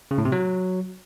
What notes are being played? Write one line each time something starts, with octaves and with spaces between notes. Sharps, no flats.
C#3
A2
C3
F#3